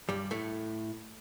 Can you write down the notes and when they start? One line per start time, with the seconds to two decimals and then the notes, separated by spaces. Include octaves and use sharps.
0.09 G2 G3
0.31 A2 A3